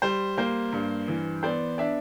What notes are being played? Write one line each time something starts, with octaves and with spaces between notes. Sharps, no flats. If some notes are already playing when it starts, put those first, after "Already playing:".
G3 C5
A#3 C5
G2
E3
B3 C5 D5
D4 D5 E5